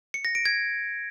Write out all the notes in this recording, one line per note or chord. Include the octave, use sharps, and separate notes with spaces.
C#7
A#6
D7
G#6